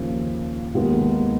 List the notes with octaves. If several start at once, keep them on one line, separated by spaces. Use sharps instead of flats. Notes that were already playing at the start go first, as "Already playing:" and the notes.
Already playing: D#2 C#3 F3
D#2 D#3 G#3 B3